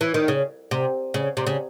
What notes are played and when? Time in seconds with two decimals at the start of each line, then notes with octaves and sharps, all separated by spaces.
0.01 E3
0.14 D#3
0.28 C#3
0.71 C3
1.14 C#3
1.37 C3
1.47 C#3